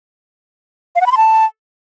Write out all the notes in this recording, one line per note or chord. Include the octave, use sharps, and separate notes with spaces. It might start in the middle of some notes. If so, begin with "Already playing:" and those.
F5
F#5
B5
C6
A5